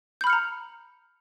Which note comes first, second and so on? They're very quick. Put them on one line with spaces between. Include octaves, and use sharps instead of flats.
G6 B5 F6 C#7 A#5